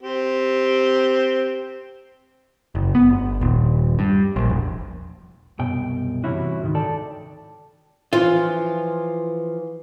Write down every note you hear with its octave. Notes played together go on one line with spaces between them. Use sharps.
C4 G4
F#1
B3
G1
D#1
G2
A#1
E1
C2 F#2 B2 G5
G2 C3 E3 C#4 E4 F#4
D2 G#2 D#3
A4 D5 G5 A5
E3 F3 F4